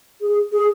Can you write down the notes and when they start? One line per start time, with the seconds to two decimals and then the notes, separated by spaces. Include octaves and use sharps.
0.21 G#4
0.52 G#4